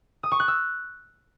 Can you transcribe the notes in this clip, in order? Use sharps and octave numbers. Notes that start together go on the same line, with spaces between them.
D#6
C#6
F#6
E6